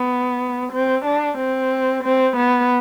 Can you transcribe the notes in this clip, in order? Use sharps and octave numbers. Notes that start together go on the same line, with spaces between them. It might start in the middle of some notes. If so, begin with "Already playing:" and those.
Already playing: B3
C4
D4
C4
C4
B3